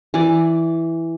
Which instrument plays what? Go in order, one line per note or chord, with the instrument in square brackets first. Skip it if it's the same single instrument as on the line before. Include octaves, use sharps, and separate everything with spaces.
[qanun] E3 D5